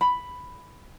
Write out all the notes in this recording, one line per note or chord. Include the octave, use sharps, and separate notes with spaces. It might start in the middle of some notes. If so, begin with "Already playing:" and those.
B5